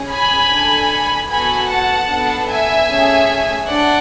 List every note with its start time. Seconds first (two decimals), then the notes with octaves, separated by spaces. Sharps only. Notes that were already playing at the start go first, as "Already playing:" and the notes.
Already playing: C#4 G#4
0.10 G#5 B5
0.50 D4 A4
1.30 B3 F#4 A4 G#5 B5
1.69 F#5 A5
2.10 B3 D4 A4
2.49 E5 G#5
2.89 A3 C#4 G#4
3.69 D4 D5 F#5